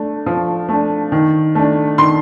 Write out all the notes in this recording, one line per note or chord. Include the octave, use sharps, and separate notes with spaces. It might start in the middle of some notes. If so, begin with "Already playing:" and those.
Already playing: A3 D4
F3
A3 D4
D#3
A3 D4
D#3 C6